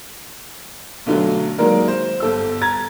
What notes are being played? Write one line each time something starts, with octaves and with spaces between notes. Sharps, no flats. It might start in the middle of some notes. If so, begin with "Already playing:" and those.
B1 D3 F#3 A3
D#3 F#3 G#3 A#3 A#4 D5
C5
G1 A4 E6
A#5 G#6 A6